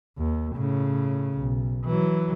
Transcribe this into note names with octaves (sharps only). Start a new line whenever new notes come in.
D#2
A2 C#3
B1
E3 F#3